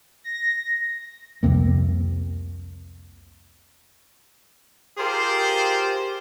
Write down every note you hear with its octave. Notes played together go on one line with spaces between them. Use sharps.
A#6
C2 F2 C3 A#3
F4 G4 G#4 A#4 C5